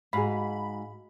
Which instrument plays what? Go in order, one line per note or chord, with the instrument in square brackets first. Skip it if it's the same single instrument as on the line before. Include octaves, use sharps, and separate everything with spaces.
[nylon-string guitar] G#2 [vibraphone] F#4 D#5 [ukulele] G#4 F5 [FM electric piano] B5